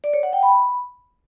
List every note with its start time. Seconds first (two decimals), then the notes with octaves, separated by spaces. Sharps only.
0.04 D5
0.13 C#5
0.23 F#5
0.33 G5
0.43 B5